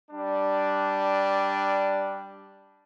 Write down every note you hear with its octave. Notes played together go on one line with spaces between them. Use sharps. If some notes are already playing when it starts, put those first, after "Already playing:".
G3 D4